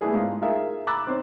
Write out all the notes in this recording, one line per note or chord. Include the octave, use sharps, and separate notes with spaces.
G3 A3 B3 E4 G#4 A4
G#2 F4 C5
D#4 F4 G#4 A#4 E5
A#5 B5 D6 E6 F#6 A6
C4 D#4 C5 C#5